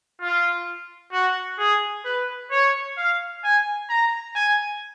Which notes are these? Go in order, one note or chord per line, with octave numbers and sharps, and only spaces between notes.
F4
F#4
G#4
B4
C#5
F5
G#5
A#5
G#5